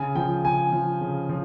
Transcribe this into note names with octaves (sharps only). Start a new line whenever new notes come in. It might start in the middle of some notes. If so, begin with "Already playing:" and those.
Already playing: C#3 G#5
F3 G5
C#3 G#5
F3
C#3
F3